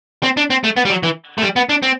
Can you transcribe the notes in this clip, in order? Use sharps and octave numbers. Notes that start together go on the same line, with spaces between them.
C4
D4
C4
A3
B3
G3
F#3
E3
A3
G3
B3
D4
C4